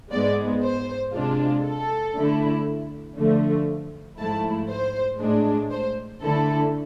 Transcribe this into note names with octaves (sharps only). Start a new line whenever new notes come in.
G#2 G#3 B3 D5
C5
C3 G#3 D4 F4
A4
D3 A3 E4
D3 F3 A3
G#2 F3 A3 E4 A5
C5
A2 G#3 D4
C5
D3 A3 E4 A4